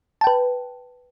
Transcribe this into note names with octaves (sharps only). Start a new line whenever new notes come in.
B4 G5 A5